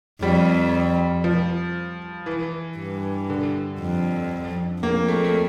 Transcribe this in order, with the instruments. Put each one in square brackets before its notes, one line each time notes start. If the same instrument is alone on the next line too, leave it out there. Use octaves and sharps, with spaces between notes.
[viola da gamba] F2 [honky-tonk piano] G3
[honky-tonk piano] F3
E3
[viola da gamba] G2
[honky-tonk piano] D3
[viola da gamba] F2
[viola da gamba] F2 [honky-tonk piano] A#3
[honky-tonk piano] A3
A3